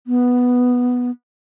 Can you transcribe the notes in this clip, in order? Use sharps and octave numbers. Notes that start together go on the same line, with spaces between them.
B3